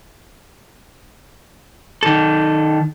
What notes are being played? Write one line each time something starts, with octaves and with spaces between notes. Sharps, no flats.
D#3 A4